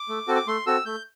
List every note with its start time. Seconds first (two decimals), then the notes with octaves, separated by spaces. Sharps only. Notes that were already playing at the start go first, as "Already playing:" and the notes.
Already playing: D6
0.09 A3
0.28 C4 F#4 A4
0.35 D6
0.47 A3 C6
0.67 C4 F#4 A4 E6
0.85 A3 G6